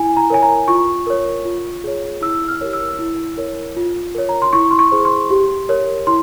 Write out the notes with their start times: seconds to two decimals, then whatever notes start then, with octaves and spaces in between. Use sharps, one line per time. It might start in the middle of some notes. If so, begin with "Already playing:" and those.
Already playing: E4 G#5
0.17 A#5
0.30 A#4 C#5 G#5
0.43 A#5
0.68 F4 C#6
1.07 A#4 C#5
1.45 F4
1.84 G#4 C#5
2.22 E4 E6
2.48 F6
2.61 G4 A#4 C#5
2.73 E6
2.99 E4
3.38 A#4 C#5
3.77 F4
4.15 A#4 C#5
4.29 A#5
4.42 C6
4.53 E4 C#6
4.71 C6
4.79 C#6
4.92 G#4 C5
5.05 C6
5.30 G4
5.69 A#4 C#5
6.07 E4 C6